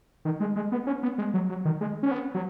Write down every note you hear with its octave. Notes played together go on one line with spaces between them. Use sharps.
D#3
G#3
G#3
B3
C#4
B3
G#3
F#3
F#3
D#3
G#3
C#4
B3
F#3